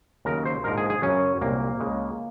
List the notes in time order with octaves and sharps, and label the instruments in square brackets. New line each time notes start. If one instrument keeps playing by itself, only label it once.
[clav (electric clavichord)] D#2 C#3 F#3 A#4
C5
A#1 G#2 F3 A#4
G#4
G#4
F#2 C#3 F#3 C#4
C2 A#2 F#3 A#3
C#2 C#3 G#3